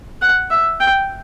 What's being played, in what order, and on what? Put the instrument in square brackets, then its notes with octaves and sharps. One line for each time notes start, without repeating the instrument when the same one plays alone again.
[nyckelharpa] F#5
E5
G5